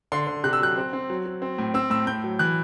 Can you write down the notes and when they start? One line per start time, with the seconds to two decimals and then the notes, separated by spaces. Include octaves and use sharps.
0.12 D3 C6
0.27 D3
0.44 C3 F#6
0.53 E6
0.61 F#3 F#6
0.77 C4
0.93 C4
1.10 F#3
1.26 F#3
1.42 C4
1.58 A2
1.74 C4 E6
1.90 A2 E6
2.07 A2 G6
2.24 F#3
2.39 E3 F#6